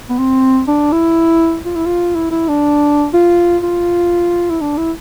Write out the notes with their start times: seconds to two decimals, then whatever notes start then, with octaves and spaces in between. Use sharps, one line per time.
0.10 B3
0.18 C4
0.68 D4
0.92 E4
1.66 F4
1.75 E4
1.86 F4
2.15 E4
2.31 E4
2.48 D4
3.14 F4
3.63 F4
4.50 E4
4.61 D4
4.77 E4